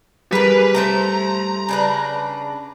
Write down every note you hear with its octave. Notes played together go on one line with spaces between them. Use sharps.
G3 G#4 A#4 B4
A3 E4 C5 A#5
C#3 D4 B4